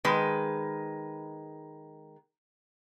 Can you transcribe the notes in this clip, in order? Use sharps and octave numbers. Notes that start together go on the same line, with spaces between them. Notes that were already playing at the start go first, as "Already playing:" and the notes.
D#3 G#3 B4